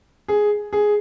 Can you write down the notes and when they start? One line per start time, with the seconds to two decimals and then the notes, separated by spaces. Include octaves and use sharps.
0.28 G#4
0.73 G#4